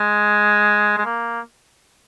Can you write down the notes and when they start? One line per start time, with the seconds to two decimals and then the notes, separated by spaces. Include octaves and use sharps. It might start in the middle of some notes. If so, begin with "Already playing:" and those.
Already playing: G#3
0.98 G#3
1.05 A#3